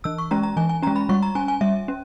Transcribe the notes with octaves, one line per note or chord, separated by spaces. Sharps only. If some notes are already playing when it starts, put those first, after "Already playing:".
E3 E6
C#6
G#3 C#4 A#5
A#5
E3 G#5
G#5
G#3 C#4 A#5
B5
G3 C#6
A#5
C#4 G#5
G#5
G3 E5
C#4